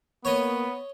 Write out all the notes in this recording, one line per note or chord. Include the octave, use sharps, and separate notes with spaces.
A#3 B3 C#5 D#5